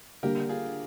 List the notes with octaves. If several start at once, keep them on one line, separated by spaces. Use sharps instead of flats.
D3 G3 A#3 G4 A#4
F4 G#4